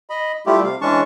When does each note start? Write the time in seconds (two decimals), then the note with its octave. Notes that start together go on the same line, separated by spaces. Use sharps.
0.10 D#5 B5
0.46 G3 A3 E4 F4 G4
0.64 C3 F5
0.81 E3 G#3 C#4 D4 A5 C#6